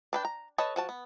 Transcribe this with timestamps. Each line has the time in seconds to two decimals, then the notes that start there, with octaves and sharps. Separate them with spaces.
0.13 D4 B4 G5
0.25 A#5
0.58 A4 B4 C#5 D#5 A5
0.76 F3 F#4 A5
0.89 B3